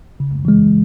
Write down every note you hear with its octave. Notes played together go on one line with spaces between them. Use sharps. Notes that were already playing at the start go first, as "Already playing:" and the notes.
C#3
E3 G#3